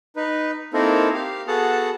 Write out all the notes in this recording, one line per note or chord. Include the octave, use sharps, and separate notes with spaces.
D#4 B4
A#3 C4 D#4 E4 A4 A#4
G4 F5
B3 F#4 G#4 A4 F#5 A5